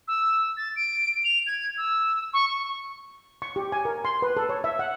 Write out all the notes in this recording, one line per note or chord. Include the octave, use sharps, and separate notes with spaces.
E6
A6
D7
F7
G#6
E6
C#6
C#6
C#6
G4
G#5
A#4
C6
B4
A4
C#5
E5
F#5